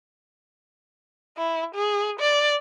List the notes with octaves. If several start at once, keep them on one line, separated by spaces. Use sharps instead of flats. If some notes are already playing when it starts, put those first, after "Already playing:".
E4
G#4
D5